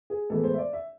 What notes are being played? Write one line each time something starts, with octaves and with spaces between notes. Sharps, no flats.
G#4
A2 E3 G#3 B3 A4
C5
E5
D5
E5